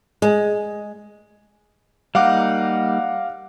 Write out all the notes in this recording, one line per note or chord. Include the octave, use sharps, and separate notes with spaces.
G#3
G3 A#3 D#4 F5 F#5 D6